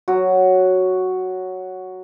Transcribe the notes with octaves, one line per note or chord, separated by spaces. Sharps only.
F#3 F#4